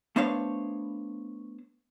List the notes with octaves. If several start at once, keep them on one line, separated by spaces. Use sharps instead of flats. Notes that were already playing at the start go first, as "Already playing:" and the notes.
A3 B3 D4 C5 C#5 F5